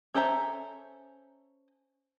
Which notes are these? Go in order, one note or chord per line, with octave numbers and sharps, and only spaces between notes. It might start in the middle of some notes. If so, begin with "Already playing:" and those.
C#4 A4 C5 E5 A#5